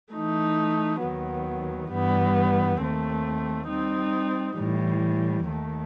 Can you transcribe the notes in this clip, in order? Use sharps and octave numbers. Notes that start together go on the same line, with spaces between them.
E3 A3 D#4
D#2 D#3 F#3 B3
G2 E3 G3 B3
D#2 D#3 A3 C4
G3 C4 D#4
A2 E3 G3
D#2 D#3 A3